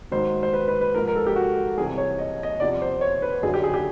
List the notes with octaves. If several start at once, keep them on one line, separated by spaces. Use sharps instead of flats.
G#2 D#3 F#3 C5
C5
B4
B4
B4
G#2 F3 A#4
A#4
A4
G4
F#4
C2 C3 E3 G#4
C#5
D#5
D#5
E2 C3 F3 D5
C5
C#5
B4
F#2 D3 F#3 G#4
G4
G#4
G4